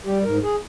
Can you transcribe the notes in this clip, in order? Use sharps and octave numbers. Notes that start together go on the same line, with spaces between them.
G3 G4
G#2 A#4
G#4